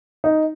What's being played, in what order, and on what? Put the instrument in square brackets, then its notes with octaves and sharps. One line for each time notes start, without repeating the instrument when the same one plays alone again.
[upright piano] D#4